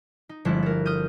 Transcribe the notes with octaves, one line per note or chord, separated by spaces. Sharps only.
D#4
G1 F3 G#3 C4 E4 F#6
A4 A#4
D#6 F6 G6 D#7